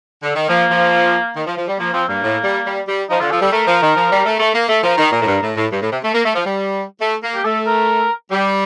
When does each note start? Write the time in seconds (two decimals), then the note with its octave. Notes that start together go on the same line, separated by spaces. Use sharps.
0.23 D3
0.36 D#3
0.49 F3 A#3
0.71 F3
1.36 D#3
1.46 F3
1.57 F3
1.68 G3
1.79 F3 A#3
1.93 F3 C4
2.08 G2 A#3
2.23 A2
2.44 G3
2.66 G3
2.88 G3
3.09 F3 D#4
3.20 D3 F4
3.31 F3 A4
3.42 G3 A4
3.52 A3 A#4
3.67 F3
3.82 D#3
3.96 F3
4.11 G3
4.25 A3
4.40 A3
4.55 A#3
4.69 A3
4.83 F3 A#4
4.98 D#3
5.12 A#2
5.21 A2
5.27 G2
5.42 A2
5.56 A2
5.71 G2
5.82 A2
5.92 C3
6.03 A3
6.14 A#3
6.25 A3
6.35 F3
6.46 G3
7.01 A3
7.23 A#3
7.35 G4
7.44 A3 A4
7.66 A#4
8.31 G3 G4